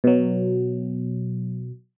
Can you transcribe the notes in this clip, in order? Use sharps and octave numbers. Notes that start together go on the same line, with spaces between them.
B2 F#3